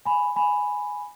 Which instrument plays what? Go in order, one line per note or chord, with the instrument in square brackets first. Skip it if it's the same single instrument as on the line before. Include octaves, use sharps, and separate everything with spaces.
[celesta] G#5 B5
G#5 B5